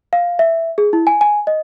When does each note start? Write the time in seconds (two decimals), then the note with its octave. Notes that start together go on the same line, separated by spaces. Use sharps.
0.13 F5
0.39 E5
0.78 G#4
0.93 E4
1.07 G#5
1.21 G#5
1.47 D#5